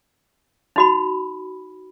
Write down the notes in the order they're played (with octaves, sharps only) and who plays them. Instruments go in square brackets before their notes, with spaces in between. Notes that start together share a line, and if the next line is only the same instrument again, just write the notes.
[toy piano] D#4 F#4 B5